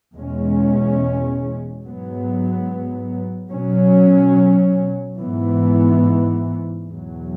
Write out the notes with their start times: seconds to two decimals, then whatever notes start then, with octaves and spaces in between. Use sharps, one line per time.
0.16 E2 B2 G#3 C#4
1.84 G#2 F#3 B3
3.52 B2 F#3 C#4
5.19 G#2 E3 B3
6.87 E2 B2 F#3